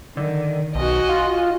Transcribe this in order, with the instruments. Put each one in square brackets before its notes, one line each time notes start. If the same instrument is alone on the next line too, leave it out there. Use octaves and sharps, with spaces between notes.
[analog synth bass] D3 [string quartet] D#3
[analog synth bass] B1 [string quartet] F#4 D#5 G#5
[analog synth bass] F4